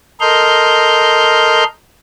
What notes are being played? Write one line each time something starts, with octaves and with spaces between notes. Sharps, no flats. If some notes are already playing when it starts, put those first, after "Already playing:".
A4 A#4 D#5 C6 F6 G6